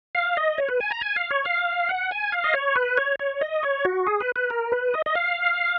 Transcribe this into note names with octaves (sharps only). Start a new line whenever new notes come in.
F5
D#5
C#5
B4
G#5
A#5
G#5
F5
C#5
F5
F#5
G#5
F5
D#5
C#5
B4
C#5
C#5
D#5
C#5
F#4
G#4
B4
B4
A#4
B4
D#5
D#5
F5